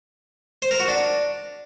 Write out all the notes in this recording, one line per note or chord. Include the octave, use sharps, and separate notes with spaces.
C5
A#4
F#4
D4